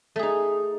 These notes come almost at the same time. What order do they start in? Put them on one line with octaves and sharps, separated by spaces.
A3 G#4 D#4